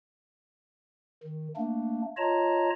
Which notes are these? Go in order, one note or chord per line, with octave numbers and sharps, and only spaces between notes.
D#3
A3 A#3 D4
F4 C#5 D#5 A5 A#5